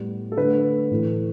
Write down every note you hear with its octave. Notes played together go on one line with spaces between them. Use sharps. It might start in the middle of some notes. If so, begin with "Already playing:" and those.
Already playing: A2 G3 B3
A4
D3 A3 B4
A2 E3 A3